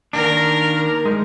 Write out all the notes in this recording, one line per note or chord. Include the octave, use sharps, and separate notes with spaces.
D#3 A#3 D4 A#4
G#3 D#4